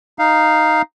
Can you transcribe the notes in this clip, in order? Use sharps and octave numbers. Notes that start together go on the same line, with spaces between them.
D#4 F5